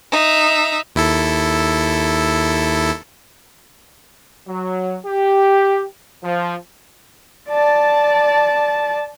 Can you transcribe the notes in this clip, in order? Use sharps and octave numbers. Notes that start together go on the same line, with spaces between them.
D#4 E5
D#2 E4 A4
F#3
G4
F3
D5 A5